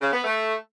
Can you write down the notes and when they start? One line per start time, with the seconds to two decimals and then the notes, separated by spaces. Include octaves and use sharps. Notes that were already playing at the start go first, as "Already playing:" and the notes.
0.02 C#3
0.13 B3
0.24 A3